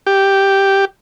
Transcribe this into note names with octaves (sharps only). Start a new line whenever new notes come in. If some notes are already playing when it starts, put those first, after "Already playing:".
G4